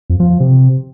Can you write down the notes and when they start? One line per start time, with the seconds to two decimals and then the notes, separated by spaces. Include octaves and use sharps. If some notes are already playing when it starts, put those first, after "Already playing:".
0.10 F2
0.20 F3
0.30 F3
0.40 C3